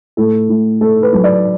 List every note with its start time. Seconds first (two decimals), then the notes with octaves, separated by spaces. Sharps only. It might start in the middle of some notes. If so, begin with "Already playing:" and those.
0.17 A2 A4
0.49 A2
0.81 A3 A4
1.03 B4
1.13 F#3
1.24 D5